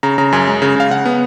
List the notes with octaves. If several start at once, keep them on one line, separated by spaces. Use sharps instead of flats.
C#3 A#5
C#3 A#5
F#2 G#5
G#3
C#3
C#3 F5
C#3 F#5
B3